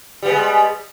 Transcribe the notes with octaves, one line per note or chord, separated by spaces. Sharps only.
G3 G#3 B3